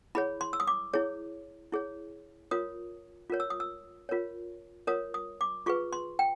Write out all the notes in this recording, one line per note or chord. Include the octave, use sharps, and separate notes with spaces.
E4 G#4 C#5 B5
C6
E6
D#6
D6
E4 G#4 C#5
E4 G#4 C#5
F4 A#4 C#5 D#6
F4 A#4 C#5
E6
D#6
E6
F4 A#4 C#5
F4 A#4 C#5 D#6
D#6
D6
F4 G#4 B4 C#6
C6
G5